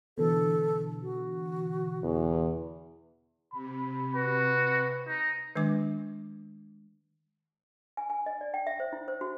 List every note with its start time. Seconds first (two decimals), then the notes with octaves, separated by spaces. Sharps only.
0.18 B2 D3 E3 A4
1.02 F#4
2.03 E2
3.52 C3 B5
4.14 F#4 B4
5.08 D#4
5.55 D#3 G#3 D4 D6
7.97 G#5
8.10 G#5
8.26 D#5
8.41 D5
8.54 G5
8.67 E5
8.80 C5
8.93 E4
9.08 C5
9.21 F#4